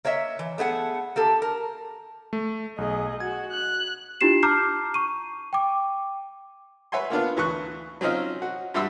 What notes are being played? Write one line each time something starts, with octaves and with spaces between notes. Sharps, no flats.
A#3 C#5 D#5 E5
E3
A3 B3 G#4 F#5
A#3 G4 A4
A#4
A3
B1 G#4 D#5
F#4 G#6
F#6
D4 E4 F4 G4 C7 E7
A5 A#5 D6 F6 G6 C7
C#6 D#7
G5 D6
B4 C#5 E5 F#5 G#5 C6
A#3 B3 D4 F4
D2 E3 C#6 F#6
F#3 C4 C#4 D#4 F4 D#5
F#4
G2 G3 F#4 E5 C6 E6